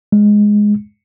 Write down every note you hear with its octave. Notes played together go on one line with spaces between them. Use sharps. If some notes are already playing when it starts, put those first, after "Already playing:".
G#3